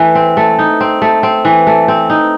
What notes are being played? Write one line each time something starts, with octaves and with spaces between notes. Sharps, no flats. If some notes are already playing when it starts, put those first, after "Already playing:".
Already playing: E3 A3
C4
A3
D#4
C4
A3
C4
E3
A3
C4
D#4